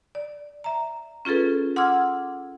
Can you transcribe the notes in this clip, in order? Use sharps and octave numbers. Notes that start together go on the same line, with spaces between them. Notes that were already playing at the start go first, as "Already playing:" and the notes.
D5
E5 A#5
C#4 F4 G#4 A4 B4
F#5 C6 D6 E6 F6 G#6